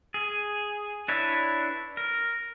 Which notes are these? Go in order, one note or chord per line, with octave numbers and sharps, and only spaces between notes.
G#4
D4 E4 B4 C#5
A#4